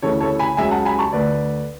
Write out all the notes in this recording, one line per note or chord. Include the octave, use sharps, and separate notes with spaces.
D2 C#3 E3 A4 C#5
A4 C#5
G#5 B5
C#2 C#3 F#3 E5 G#5
F#5 A5
G#5 B5
A5 C#6
D2 D3 A3 B4 D5